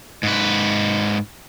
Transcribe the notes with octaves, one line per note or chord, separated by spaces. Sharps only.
G#2 B4